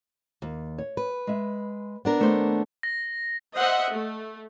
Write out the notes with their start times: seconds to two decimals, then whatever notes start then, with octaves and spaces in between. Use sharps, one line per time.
0.42 D#2
0.78 C#5
0.97 B4
1.27 G#3 E5
2.05 B3 D4 A#4
2.18 D#2 A3 C5
2.83 A#6
3.57 C5 D#5 E5 F#5
3.92 A3